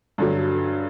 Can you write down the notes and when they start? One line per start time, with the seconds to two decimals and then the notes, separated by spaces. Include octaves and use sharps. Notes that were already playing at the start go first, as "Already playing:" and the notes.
0.18 G2 D3 F#3